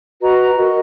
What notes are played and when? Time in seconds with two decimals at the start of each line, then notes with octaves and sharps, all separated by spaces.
0.20 F#4 B4 D#5 A#5
0.56 F#4 A#4 D#5